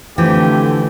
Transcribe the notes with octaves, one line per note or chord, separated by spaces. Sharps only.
D3 E3 F3 A3 C4 G4